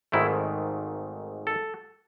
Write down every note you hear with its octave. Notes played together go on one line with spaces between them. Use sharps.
G#1 G#2 D#3 A3 E4
A4